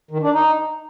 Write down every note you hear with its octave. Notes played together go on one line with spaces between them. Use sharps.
D#3
D4
D#4